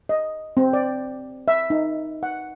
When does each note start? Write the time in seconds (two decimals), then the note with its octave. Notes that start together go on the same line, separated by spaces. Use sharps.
0.09 D#5
0.57 C4
0.73 D5
1.48 E5
1.70 D#4
2.23 F#5